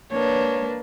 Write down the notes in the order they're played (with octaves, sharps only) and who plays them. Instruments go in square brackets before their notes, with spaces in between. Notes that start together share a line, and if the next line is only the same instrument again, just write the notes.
[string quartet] A#3 D4 B4 [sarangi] C#5